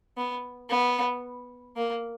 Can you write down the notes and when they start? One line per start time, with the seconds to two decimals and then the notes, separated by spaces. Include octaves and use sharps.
0.17 B3
0.70 B3
1.76 A#3